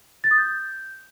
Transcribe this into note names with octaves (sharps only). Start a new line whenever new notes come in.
A6
D#6
G6